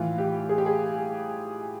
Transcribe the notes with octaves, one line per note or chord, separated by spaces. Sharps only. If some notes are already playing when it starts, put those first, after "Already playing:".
Already playing: A2 E3 F4
G4
G#4
G4
G#4